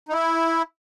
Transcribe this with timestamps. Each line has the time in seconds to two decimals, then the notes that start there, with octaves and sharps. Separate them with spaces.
0.09 D#4
0.13 E4